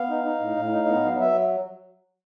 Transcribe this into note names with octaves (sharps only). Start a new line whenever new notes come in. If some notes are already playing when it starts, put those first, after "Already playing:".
Already playing: B3 F5
D#4
D#4
A2
A2
D#4
B3
F#3
F#3 E5